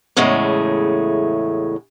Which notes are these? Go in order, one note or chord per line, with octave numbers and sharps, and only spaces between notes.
E2 A2 C#3 G#3 A3